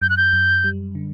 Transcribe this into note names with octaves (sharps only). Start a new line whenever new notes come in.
F#2 G6
F#6
G6
F#2
G3
D3